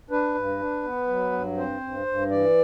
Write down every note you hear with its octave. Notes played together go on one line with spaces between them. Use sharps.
D4 B4
G2
D4
B3
F#3
G2
C4 C5
G2
G2
E3 D5